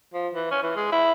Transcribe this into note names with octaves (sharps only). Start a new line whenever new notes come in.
F3
E3
C#4
E3
G#3
E4